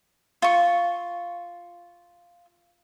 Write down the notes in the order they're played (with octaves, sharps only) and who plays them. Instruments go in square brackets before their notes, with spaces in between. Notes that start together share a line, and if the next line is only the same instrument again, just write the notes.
[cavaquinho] F4 C#6